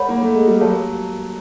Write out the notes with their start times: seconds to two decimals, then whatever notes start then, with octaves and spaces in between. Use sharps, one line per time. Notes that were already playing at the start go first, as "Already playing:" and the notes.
Already playing: G#3 A#4 C#5 F#5 B5
0.09 A#3
0.22 A3
0.35 G#3
0.47 G3
0.60 F#3 G4 A#4 C#5 F5 A5